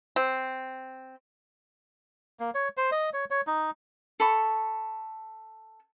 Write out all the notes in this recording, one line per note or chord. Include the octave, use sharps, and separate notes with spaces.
C4
A#3
C#5
C5
D#5
C#5
C#5
D#4
A4 B5 C#6